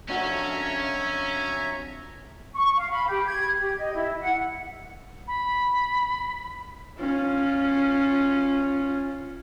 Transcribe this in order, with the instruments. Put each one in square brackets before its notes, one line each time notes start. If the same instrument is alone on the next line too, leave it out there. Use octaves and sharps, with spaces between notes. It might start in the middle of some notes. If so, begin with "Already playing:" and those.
[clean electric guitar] F2 D4 F#4 [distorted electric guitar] C#4 [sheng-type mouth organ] C#5 E5 A#5
[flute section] C#6
F5
B5
G4
G#6
G4
D#5
E4
F#5
[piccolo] B5
[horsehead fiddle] C#4 F4